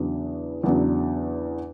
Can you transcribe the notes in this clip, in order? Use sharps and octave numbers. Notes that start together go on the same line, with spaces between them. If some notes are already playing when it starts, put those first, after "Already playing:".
Already playing: E2 C#3 F#3 B3 D4
E2 C#3 F#3 B3 D4